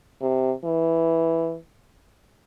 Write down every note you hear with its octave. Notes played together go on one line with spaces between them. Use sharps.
C3
E3